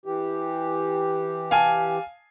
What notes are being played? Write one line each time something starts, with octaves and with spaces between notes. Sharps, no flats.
E3 G4
F5 G#5 A5